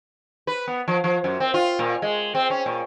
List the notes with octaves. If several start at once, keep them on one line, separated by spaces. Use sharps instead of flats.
B4
B3
F3
F3
F#2
C4
F4
A#2
G#3
C4
C#4
A#2